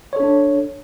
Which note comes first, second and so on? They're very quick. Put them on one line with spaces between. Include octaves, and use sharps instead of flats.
C#5 A4 D4